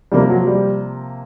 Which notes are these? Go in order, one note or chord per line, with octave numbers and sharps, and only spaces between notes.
C3 F3 G3 A#3
F#3
G3